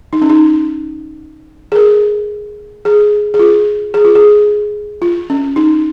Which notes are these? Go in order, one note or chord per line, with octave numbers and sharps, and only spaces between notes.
D#4
C#4
D#4
G#4
A#4
G#4
G#4
F4
G#4
F4
G#4
F4
C#4
D#4